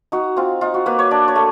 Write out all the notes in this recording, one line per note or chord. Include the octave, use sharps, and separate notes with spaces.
D#4 F#4
C4 F4
D#4 F4
F#4
A#3 B4
C#5
D4 D5
C#5
A3